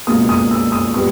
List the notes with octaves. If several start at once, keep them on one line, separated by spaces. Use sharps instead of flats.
C#2 B2 A#3 D#6
D#6
E6
D#6
A#2 G3 B3 D#6